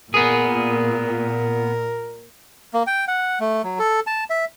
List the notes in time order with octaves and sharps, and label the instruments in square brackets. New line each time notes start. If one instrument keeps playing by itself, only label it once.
[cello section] A#2 [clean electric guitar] B3 G#4 [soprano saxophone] A#4
[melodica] A#3
G5
F#5
A3
F#3
A4
A5
E5